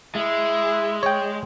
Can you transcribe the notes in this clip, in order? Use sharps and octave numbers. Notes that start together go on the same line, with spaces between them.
G#3 E4
C#5 G5